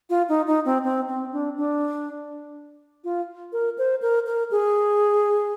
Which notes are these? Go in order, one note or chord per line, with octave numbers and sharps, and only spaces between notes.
F4
D#4
D#4
C4
C4
C4
D4
D4
F4
A#4
C5
A#4
A#4
G#4